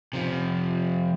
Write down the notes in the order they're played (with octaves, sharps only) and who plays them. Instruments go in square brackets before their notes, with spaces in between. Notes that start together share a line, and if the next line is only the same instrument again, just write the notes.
[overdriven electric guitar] C3 F3